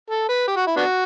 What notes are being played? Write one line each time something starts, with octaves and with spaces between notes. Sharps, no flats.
A4
B4
G4
F#4
E4
B3 D4 F#4